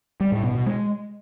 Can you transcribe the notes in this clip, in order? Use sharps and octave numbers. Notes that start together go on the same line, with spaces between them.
G3
A2
B2
B2
G#3